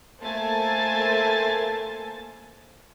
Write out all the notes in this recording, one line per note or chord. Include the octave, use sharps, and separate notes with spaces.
A3 A#3 C5 G#5 A5 A6